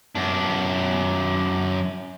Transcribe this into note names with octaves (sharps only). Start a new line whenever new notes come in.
F#2 D4